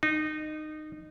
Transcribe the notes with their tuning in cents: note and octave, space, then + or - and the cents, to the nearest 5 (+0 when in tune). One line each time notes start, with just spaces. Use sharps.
D#4 -20